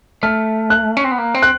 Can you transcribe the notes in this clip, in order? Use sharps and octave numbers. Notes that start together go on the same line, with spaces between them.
A3 F6
F#6
C#4
C4
B3
A#3
C4
F#6